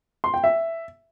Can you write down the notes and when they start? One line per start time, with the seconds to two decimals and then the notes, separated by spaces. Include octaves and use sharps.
0.24 C6
0.34 G5
0.44 E5